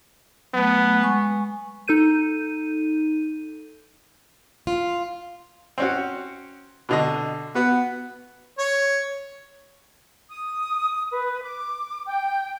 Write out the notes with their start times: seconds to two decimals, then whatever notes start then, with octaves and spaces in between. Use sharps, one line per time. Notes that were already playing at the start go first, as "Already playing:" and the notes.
0.54 F#3 A3 B3
1.01 G#3 G#5 C#6
1.88 D#4 A4 G6 D#7
4.67 F4
5.78 C4 C#4 F#4
6.89 B2 D3 D#5
7.55 B3 F#4
8.58 C#5
10.30 D#6
11.11 B4
11.42 D6
12.06 G5